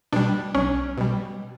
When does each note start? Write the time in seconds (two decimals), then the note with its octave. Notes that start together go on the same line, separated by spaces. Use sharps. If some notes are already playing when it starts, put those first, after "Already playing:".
0.13 B2 G3 D4
0.55 B1 C#4
0.98 B2 G3